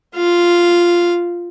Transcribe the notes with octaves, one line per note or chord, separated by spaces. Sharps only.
F4 F5